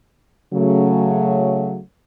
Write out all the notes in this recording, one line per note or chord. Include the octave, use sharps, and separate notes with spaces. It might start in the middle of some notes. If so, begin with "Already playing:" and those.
C#3 F#3 A3